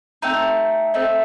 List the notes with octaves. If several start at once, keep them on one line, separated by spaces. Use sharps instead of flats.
A3 C4 D#4
A3 C4 D#4